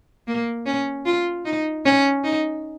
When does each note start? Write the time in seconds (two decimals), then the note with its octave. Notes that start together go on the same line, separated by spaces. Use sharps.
0.27 A#3
0.66 C#4
1.05 F4
1.45 D#4
1.85 C#4
2.24 D#4